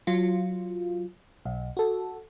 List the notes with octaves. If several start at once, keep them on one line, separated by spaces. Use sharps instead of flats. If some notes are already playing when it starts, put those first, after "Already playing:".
F#3 F4
B1
F#4 A4